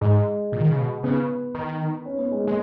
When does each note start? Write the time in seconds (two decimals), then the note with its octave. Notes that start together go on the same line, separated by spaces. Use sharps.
0.01 G#2 G#3
0.52 A#2
0.60 D#3
0.69 C#3
0.78 B2
1.03 C#3 B3
1.55 D#3
2.05 C#4
2.18 B3
2.31 G#3
2.44 G#3 A#3